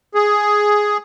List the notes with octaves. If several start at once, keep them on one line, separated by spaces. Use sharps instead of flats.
G#4